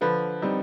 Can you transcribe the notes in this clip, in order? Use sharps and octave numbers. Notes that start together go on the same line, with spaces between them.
D3 F3 B4
G3 C4 D#4